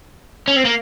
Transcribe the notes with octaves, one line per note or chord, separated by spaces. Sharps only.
C#4
C4
A#3